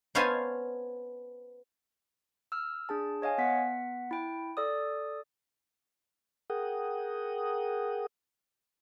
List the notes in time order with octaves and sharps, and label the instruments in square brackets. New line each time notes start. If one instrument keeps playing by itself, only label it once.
[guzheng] B3 C5 C#5 F5 G#5 A5
[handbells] E6 F6
D4 G#4 A5
C#5 D#5 F5 G#5
B3 F#5 B6
E4 G5
A4 D5 D#6
[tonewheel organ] G#4 A#4 F#5 G5 D#6